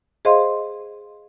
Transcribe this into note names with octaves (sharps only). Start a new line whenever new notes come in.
G#4 C5 D#5 F5 C6